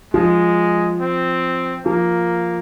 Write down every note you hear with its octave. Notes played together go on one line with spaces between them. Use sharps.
F3 G#3
C4
F3 A#3